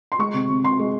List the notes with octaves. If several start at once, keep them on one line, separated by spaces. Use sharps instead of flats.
C6
G#3 C#6
C3
C3
C3 C6
G#3